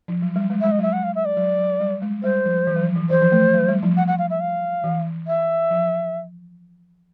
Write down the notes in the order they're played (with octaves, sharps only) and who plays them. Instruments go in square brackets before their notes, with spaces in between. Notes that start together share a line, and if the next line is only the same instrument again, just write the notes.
[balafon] F3
F#3
G3
G#3
[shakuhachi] E5
[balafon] G#3
[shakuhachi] D#5
[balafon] F#3 [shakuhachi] E5
[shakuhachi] F#5
F5
E5
D5
[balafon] F#3
F#3
G3
G#3
[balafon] G3 [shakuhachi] C5
[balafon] F3
E3
F#3
F3
E3
[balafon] E3 [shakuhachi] C5
[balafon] F3
A3
F#3
G3
F3
[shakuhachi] F#5
F#5
F5
E5
F5
[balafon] E3
[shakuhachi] E5
[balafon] F3